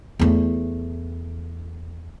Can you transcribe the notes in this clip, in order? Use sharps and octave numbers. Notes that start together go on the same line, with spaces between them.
E2 A3